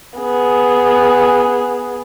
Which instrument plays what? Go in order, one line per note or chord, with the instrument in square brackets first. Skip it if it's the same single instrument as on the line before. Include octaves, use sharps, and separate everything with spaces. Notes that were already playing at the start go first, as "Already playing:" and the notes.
[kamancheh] B3 G#4